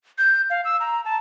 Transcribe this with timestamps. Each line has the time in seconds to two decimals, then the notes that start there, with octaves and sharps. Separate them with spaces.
0.18 G6
0.50 F5
0.65 E6
0.80 A#5
1.05 A5